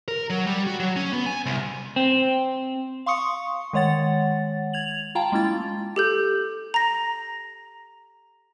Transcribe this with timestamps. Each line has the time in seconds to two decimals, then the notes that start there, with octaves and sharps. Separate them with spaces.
0.08 A#4
0.30 F#3
0.46 G3
0.67 F#4
0.80 F#3
0.96 C#4
1.13 B3
1.26 G#5
1.46 C2
1.96 C4
3.06 F5 C6 C#6 D#6 C#7
3.73 D#3 G#3 C#5 F#5 A6
4.73 G#6 F7 F#7
5.15 F4 F5 G5 A5 A#5
5.32 G#3 A#3 C#4 E4 A6
5.96 G4 A4 G6
6.74 A#5 A#6